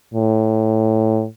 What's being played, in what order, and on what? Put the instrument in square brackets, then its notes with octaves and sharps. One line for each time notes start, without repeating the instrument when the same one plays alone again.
[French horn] A2